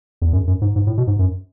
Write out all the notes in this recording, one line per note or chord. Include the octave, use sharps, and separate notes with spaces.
E2
F#2
F#2
G#2
G#2
A2
B2
G#2
F#2